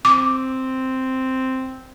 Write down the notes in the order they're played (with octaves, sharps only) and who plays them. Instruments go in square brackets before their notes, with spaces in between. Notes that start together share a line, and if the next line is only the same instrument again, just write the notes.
[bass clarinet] C4 [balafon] D6